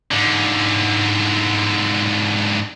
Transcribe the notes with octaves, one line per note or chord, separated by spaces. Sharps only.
G#2 D3